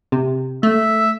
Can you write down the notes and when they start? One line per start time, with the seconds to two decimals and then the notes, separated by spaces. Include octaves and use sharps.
0.12 C3
0.63 A3 E5